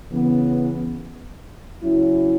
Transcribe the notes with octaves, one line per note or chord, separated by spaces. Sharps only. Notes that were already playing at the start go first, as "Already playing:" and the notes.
C#3 E3 B3
C#3 F#3 C#4 E4